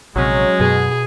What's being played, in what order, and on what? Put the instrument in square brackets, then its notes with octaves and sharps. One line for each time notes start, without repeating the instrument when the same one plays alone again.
[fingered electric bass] A#1 C3 [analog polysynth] F#3 C#4 [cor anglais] G#3
[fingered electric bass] F#2 [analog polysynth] B2 [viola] G#4